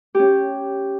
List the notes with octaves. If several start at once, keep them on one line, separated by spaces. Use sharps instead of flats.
C#4 G4